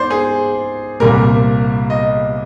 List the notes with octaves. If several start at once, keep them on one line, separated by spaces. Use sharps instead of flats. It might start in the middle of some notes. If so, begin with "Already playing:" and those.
Already playing: G#2 C5 D5
G#4
C2 A#2 G3 A#4
D#5